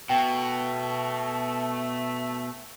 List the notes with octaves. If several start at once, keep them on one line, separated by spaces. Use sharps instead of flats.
B2 A3 G5